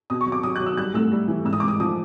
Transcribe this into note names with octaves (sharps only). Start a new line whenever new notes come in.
B2 D#6
C#6
F#3
D6
F#3 D#6
F#6
F#3
E6
G3 F#6
A2 E6
G3
E3
G#2 E6
D#6
D6
G#2
D#6
F3 D#6